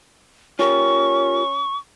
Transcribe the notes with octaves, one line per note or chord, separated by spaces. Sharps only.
C#4 F4 G4 A#4 C#6